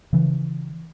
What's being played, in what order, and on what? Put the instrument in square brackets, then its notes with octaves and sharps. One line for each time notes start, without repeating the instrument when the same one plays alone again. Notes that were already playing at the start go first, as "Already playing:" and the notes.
[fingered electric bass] C#3 E3